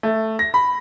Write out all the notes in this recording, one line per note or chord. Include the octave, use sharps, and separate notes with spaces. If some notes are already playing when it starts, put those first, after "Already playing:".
A3
A#6
B5